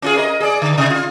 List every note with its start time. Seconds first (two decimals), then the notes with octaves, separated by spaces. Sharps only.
0.02 C#4 F4 G#4
0.17 A#4 D#5
0.40 G#4 D5
0.62 D3
0.78 C3
0.90 F4